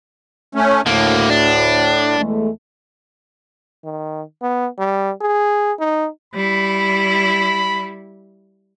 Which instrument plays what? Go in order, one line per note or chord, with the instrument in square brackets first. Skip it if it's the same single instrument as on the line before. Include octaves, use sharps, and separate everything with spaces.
[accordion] A3 C#4
[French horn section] D2 [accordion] A2 [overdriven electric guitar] D3 A#3
[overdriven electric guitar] D4
[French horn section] E2 G#3 A3
[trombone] D#3
B3
G3
G#4
D#4
[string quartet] G3 E4 [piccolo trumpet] B5